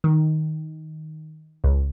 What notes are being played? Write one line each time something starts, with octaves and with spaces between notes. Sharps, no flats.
D#3
C#2